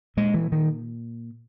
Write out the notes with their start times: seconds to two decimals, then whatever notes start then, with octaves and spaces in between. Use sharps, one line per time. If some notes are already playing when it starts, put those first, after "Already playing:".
0.17 A#2 G#3
0.34 E3
0.52 D#3